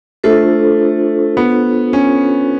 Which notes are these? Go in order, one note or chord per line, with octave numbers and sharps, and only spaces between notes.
A3 D4 F4 A4 C5
B3
C#4